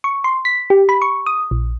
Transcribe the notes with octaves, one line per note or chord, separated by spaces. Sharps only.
C#6
C6
B6
G4
B5
C#6
D#6
A#1